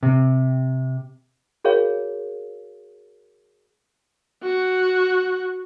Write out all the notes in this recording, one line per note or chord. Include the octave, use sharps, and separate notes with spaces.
C3
F#4 G#4 A#4 C#5 F5
F#4